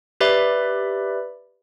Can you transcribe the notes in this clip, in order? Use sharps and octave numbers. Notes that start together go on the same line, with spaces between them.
G4 B4 D5 E5 B5